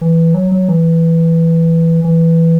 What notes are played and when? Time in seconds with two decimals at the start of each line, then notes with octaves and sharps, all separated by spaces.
0.01 E3
0.34 F#3
0.52 F#3
0.68 E3
2.04 E3